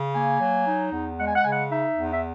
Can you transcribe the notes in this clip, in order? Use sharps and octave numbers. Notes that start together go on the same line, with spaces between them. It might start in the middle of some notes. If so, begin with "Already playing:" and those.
Already playing: C#3
A#3 G#5
F#3
D#4
E2
G#3 F#5
G#5
F#5
C#3 G#5
F#5
D#4 E5
E2
E5